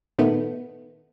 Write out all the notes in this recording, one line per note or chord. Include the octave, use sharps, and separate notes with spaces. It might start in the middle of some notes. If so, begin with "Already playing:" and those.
A#2 D#3 A3 B3